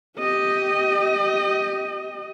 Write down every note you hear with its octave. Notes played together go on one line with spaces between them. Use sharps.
G4 D#5